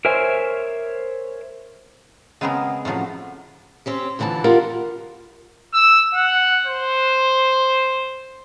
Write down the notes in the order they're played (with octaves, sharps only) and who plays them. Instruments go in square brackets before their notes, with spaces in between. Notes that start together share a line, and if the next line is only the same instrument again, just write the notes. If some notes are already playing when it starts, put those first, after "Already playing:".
[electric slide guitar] A#4 C5 C#5 E5 G#5
[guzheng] C#3 G#3 B3 C4 G#4 A#4
A2 C#3 F3 F#3
[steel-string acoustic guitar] C4 C#4 G4
F2 D3 E3 F#4 A5
F4 G4 A#4 F5 F#5
[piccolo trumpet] E6
F#5
C5